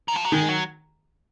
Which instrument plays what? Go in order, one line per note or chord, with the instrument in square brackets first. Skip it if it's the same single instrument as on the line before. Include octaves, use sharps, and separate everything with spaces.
[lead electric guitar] D#3
F3
F#3
[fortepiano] D#3 [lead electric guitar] G#3
[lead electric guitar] F#3